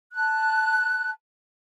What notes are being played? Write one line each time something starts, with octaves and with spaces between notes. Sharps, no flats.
A5 F#6